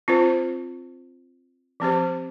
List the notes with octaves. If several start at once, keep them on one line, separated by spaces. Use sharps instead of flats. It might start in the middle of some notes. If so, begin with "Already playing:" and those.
C4 F4 C5
F3 C4 G4 C5